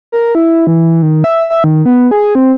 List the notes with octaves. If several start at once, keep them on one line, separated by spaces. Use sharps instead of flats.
A#4
E4
E3
D#3
E5
E5
D#3
B3
G#4
C4